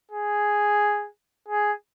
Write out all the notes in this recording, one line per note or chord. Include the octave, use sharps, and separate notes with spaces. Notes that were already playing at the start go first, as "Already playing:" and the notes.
G#4
G#4